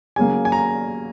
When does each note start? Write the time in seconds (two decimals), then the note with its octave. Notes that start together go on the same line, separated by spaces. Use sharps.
0.16 C#3 F#3 A#3 G#5
0.45 G#5
0.52 A#5